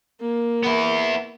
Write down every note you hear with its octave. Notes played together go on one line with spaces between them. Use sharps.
A#3
B3 E4